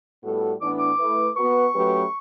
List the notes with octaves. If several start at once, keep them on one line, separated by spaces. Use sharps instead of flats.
A2 G3 B3 F#4 A4
A2 E3 B3 D4 D6
D6
A3 E4 B4
B3 F#4 B4 C#6
F#3 A3 C#4 G4 B4